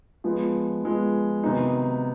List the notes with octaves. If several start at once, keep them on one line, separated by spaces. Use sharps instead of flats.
F3 G#3 B3
F3 G#3 B3
C3 D#3 F#3 B3 D#4